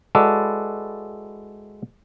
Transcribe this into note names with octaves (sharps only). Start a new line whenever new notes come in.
G#3 E4 F#4 A4 B4 D5